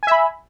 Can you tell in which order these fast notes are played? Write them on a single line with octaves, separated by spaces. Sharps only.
G#5 E5 B5